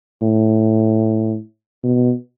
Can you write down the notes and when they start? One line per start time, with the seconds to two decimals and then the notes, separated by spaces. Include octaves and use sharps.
0.22 A2
1.83 B2